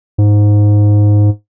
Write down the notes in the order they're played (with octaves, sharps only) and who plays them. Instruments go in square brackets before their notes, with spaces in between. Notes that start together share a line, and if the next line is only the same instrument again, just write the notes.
[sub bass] G#2